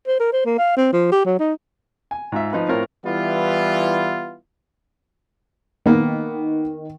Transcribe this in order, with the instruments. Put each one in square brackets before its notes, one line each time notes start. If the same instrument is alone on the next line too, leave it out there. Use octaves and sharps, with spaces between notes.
[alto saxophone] C5
A#4
C5
A#3
F5
C4
F3
G4
F#3
D#4
[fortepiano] G#5
G#2 F4 E5
F3 D#4 F4 B4
A2 C4 F4 A#4 C#5
[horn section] E3 G3 B3 E4 F4
[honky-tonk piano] D#3 [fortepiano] A#3 B3